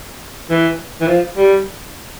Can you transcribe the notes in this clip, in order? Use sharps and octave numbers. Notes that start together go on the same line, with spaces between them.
E3
E3
F3
G3